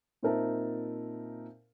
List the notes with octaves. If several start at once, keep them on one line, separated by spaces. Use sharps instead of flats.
A#2 C4 D#4 A#4 E5 A5